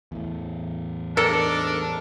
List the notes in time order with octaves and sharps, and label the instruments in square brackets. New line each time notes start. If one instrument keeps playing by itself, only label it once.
[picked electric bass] E2 A2
[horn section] G#2 D4 [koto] A4 [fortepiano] A#4